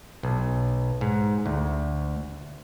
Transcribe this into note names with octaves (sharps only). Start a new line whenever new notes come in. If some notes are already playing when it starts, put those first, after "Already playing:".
B1
G#2
D2